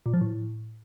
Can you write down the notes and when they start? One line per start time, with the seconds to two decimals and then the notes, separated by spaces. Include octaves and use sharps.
0.06 A#2
0.13 F3
0.21 A2